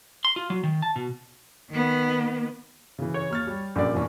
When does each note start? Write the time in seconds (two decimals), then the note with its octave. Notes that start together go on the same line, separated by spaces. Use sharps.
0.25 C6
0.36 F4
0.50 F#3
0.64 D#3
0.82 A5
0.96 B2
1.70 D#3 B3
2.98 C#3 E3
3.14 C#5
3.30 D#2 F6 A6
3.47 G3
3.76 A#1 F#2 D5
3.93 F1 E3 C#4